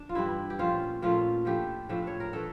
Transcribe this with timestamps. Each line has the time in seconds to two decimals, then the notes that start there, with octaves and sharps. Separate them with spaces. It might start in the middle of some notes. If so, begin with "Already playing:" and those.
Already playing: D4
0.09 F4
0.15 G2 E3 G3 E4
0.50 G4
0.59 A#2 F3 A3 C#4 F4
1.02 A#2 F3 A3 C#4 F4
1.45 A2 F3 A3 D4 G4
1.89 A2 F3 A3 D4
2.07 C#5
2.20 A#4
2.33 E3 A3 D4 A4